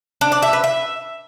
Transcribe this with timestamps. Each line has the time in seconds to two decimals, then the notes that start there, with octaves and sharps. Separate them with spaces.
0.21 D4
0.32 D5
0.42 E5
0.53 B4
0.64 E5